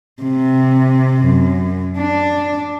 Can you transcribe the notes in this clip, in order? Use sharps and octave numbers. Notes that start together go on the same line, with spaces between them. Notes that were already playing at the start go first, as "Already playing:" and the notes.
C3
F#2
D4